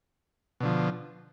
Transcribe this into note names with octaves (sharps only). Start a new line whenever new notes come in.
B2 D3 F3